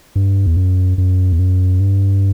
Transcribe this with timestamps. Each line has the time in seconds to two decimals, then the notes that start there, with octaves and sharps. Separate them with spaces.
0.16 G2
0.46 E2
0.57 F#2
0.98 F#2
1.32 E2
1.39 F#2
1.80 G2